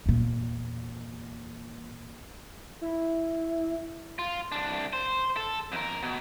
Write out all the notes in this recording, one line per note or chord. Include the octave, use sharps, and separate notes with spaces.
E2 A#2
E4
F4
C2 D4
C5
A4
F2 A#4
B2